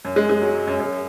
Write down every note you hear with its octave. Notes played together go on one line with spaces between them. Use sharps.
F#2
G#3
G#3
F#3
F#2
F#2